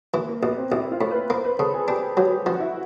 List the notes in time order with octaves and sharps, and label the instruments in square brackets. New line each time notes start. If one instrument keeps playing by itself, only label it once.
[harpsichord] E3 [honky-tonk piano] A#3
[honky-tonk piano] A#3
[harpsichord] A#1 [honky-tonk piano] B3
[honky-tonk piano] C4
[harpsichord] A#1 [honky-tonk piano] E4
[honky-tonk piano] F4
[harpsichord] A2
[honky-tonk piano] B4
[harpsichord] A#3 [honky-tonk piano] C5
[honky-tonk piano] B4
[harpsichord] C#3 [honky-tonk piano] A4
[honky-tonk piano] G#4
[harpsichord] D4 [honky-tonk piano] G4
[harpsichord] F#3 [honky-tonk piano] G4
[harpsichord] F3 [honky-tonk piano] F#4
[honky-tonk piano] E4